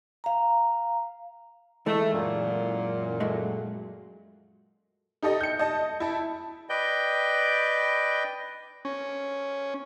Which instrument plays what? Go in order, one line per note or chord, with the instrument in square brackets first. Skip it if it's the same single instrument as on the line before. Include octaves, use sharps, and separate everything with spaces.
[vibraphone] F5 A#5
[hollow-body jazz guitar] E3 G#3 [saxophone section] A3
[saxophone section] F#2 A#2
[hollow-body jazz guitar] F#3 G#3 A3
[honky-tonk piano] D#4 G4 A4 D#5
G6 C#7
D#5 A5
E4 A5
[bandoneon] B4 D5 D#5 G5 G6
[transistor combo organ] C#4